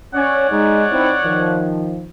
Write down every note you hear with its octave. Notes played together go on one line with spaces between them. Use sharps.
C#4 C#5 D5 F#5
G#3 D#4
C4 D#4 E4
D#3 F3